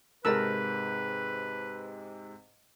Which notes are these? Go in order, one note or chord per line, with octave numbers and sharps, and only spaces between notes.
G#2 C3 G#3 A#4 B4 A5 E6